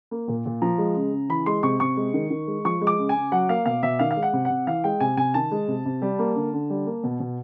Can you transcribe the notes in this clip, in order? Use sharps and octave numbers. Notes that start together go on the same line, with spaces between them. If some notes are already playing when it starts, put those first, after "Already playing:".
A#3
A#2
A#2
F3 A#5
G#3
C#3
C#3
E3 B5
G#3 C6
C3 C#6
C3 C#6
G#3
D#3
D#3
G#3
F3 C#6
G#3
D6
C#3
G#5
C#3
F#3 F#5
A#3 F5
B2 F5
B2 E5
D#3 F5
F5
G#3
F#5
C3
C3 F#5
E3 F5
G#3 G5
C3 G#5
C3 G#5
D#3 A5
G#3
C3
C3
G3
A#3
D3
D3
G3
A#3
B2
B2